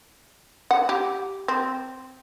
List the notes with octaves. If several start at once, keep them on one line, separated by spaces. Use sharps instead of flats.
F#5
G4
C4